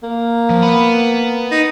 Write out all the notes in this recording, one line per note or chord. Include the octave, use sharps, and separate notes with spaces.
A#3
F3
B3 B5
D#4